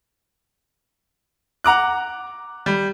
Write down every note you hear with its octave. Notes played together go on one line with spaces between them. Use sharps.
F#5 A#5 D6 F#6
G3